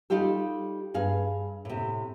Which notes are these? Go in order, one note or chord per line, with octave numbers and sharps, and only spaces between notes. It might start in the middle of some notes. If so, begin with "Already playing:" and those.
G3 D#4 F4 G4 A4
G2 G#4 F5
A2 C3